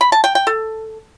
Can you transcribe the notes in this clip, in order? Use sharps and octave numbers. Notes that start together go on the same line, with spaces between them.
B5
A5
G5
G5
A4